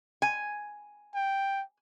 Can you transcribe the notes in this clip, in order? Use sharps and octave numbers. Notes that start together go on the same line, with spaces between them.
G#5
G5